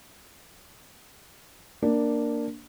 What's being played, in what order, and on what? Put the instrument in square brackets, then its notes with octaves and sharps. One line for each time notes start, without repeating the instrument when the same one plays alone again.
[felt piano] A#3 D4